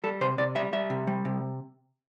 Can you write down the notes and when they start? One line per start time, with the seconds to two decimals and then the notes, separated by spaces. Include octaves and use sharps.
0.04 G3 A4
0.21 C3 C5
0.38 C3 D5
0.55 G3 E5
0.73 G3 E5
0.90 C3
1.07 G3
1.25 C3